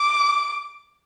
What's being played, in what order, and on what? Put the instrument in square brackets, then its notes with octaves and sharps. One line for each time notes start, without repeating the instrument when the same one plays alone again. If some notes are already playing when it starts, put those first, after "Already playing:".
Already playing: [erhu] D6